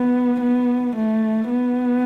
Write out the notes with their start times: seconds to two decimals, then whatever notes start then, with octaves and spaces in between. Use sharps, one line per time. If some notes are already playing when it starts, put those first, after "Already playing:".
Already playing: B3
0.40 B3
0.95 A3
1.49 B3